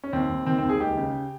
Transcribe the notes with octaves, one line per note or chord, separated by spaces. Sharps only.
C#4
D#2 C4
D#2
D#3 C4
D#2 C4
G#4
C#2 G4
C#3